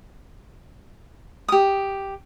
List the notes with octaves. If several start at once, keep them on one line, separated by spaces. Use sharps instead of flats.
G4 D#6